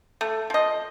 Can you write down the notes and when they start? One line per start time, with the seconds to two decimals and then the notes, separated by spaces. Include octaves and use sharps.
0.21 A3
0.50 F3 D#5